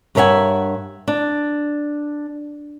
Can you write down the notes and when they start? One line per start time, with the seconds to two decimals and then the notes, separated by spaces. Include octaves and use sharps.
0.15 G2 A#4 C#5 E5 F#5 G#5
1.08 D4